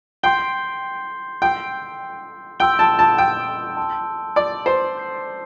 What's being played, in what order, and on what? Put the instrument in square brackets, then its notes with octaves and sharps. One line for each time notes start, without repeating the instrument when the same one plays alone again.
[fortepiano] G5 [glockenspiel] C6 G6 C7 G7
[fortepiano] G5 [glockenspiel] E6 G6 C7
[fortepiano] G5 [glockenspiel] C6 E6 G6 D7 G7
[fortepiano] A5
A5
G5
[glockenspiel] A5 C6 E6
[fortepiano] D5
C5
[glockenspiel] C6 G6 C7